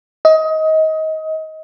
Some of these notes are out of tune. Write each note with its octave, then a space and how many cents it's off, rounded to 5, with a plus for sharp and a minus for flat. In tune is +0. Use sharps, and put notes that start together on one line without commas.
D#5 +25